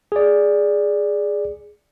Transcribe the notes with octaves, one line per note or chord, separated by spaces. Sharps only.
G#4 D5